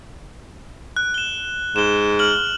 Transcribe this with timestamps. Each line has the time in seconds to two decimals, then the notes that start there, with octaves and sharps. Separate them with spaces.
0.96 F#6
1.14 E7 G7
1.76 G#2 E7 G7
2.19 F6 F#7 G7